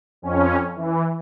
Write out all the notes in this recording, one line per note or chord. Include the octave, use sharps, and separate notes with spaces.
F2 C#4
E3